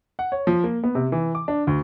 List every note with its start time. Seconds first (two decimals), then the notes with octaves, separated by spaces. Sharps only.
0.19 F#5
0.32 C#5
0.47 F3
0.64 A#3
0.84 B3
0.95 C3
1.12 E3
1.35 D6
1.48 D4
1.67 D2